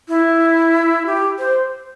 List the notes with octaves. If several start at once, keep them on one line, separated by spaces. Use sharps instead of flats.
E4
G4
C5